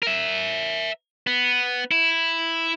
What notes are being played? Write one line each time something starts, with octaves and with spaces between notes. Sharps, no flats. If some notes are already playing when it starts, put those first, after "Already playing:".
A#4 E5
B3
E4